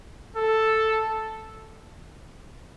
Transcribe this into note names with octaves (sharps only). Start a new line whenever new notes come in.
A4